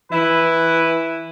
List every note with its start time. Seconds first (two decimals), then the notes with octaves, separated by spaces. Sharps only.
0.12 E3 E4 B4